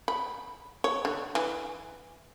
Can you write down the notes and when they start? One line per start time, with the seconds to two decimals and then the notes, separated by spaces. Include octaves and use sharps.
0.08 B5
0.84 C#5
1.05 D3
1.35 E3